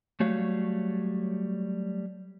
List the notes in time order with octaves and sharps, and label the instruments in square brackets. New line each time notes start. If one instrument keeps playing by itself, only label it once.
[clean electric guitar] F#3 G3 A3 F#4 C#5 F5